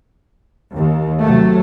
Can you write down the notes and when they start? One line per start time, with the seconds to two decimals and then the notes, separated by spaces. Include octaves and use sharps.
0.75 D#2
1.22 C3 F#3 A3